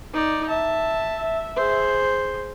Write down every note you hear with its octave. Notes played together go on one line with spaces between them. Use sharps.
D#4 D5
E5 A5
G#4 C5